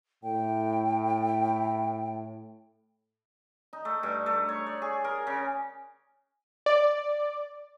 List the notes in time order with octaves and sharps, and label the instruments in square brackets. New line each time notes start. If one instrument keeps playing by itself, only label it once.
[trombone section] A2 [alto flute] G5
[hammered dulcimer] D#4
A3
G2
A3
C#5
D5
G#4
A#4
C#3
[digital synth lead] D5